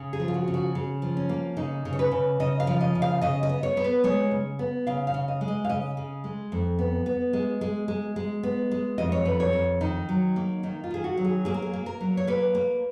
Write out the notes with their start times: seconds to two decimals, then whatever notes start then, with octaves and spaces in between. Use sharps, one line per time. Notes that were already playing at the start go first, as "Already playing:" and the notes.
Already playing: C#3
0.13 G#4
0.20 F3
0.28 F4
0.34 F#4
0.48 C#3
0.54 F#4
0.75 C#3
1.02 F3
1.17 C#4
1.29 A#3
1.57 C#3 D#4
1.85 C#3
1.93 C#5
1.99 B4
2.12 C#3
2.40 C#3 D#5
2.60 F5
2.67 F3
2.81 D#5
2.95 C#3
3.02 F5
3.22 C#3 D#5
3.43 D#5
3.49 B3
3.63 C#5
3.77 B3
3.84 B4
4.04 G#3 C#5
4.31 C#3
4.59 B3
4.87 C#3 F5
5.07 F5
5.14 C#3
5.28 D#5
5.41 G#3
5.48 D#5
5.65 F5
5.70 C#3 D#5
5.97 C#3
6.24 G#3
6.52 F2
6.79 B3
7.06 B3
7.33 G#3
7.61 G#3
7.88 G#3
8.16 G#3
8.43 B3
8.71 G#3
8.98 F2 D#5
9.12 C#5
9.25 F2 B4
9.40 C#5
9.53 F2
9.81 D#3 D#4
10.09 F#3
10.36 A#3
10.63 D#3 D#4
10.84 F4
10.91 D#3 G#4
11.04 F#4
11.18 F#3
11.25 G#4
11.45 A#3 G#4
11.54 A#4
11.62 G#4
11.73 A#3
11.86 A#4
12.01 F#3
12.17 C#5
12.27 A#3 B4
12.55 A#3